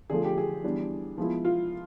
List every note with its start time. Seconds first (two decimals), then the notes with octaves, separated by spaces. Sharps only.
0.10 D3 F3 A3 G#4
0.24 G4
0.38 G#4
0.64 E3 G3 B3 D4
1.18 F3 G#3 B3 E4
1.45 F4